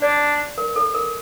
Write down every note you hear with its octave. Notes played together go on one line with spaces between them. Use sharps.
D4 D5
A#4
A4
A#4